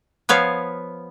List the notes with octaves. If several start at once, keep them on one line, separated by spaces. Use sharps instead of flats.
F3 B3 C#5 F5